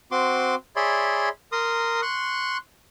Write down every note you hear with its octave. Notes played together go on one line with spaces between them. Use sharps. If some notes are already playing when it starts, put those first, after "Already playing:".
C4 F#4 C6 D6
G#4 C#5 D5 E5 B5 C6
A#4 A#5 C6 D#6
C6 C#6 F#6